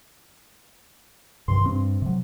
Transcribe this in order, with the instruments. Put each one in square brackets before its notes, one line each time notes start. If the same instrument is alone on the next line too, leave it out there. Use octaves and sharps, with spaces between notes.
[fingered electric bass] G2 C3 D#3 [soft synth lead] C6
[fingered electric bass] G2 [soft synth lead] C4
[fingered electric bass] C3 F#3